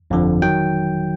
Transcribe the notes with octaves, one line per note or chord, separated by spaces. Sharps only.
G1 F2 D3 F3
D#3 F#3 G5